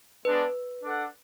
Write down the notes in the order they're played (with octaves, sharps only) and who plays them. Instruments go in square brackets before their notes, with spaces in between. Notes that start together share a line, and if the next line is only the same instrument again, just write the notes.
[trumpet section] G#3 B3 D4 [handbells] B4
[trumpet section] D4 A4 D5 F#5